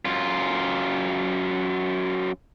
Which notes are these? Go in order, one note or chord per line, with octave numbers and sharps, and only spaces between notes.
F#2 F4